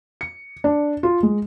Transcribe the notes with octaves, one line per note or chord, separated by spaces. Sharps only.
C#7
D4
F4
G#3